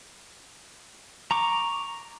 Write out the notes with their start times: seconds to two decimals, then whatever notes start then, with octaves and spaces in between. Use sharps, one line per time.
1.31 A#5 C#6 D6